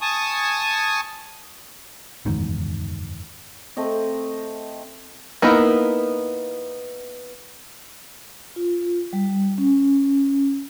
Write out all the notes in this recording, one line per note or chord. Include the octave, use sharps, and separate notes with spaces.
G#5 A5 C#6 D#6
F#1 E2 G#2 D#3
A3 C4 D#5
A#3 B3 D#4 E4 A#4
F4
G3
C#4